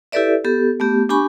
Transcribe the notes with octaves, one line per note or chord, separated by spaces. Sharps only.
E4 G4 A4 B4 D5 E5
B3 G4 A4
A3 B3 G4
D4 G4 G#5 B5 C#6